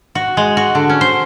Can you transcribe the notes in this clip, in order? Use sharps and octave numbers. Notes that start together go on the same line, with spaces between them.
F#4
G#3
F#4
D3
C#4
C5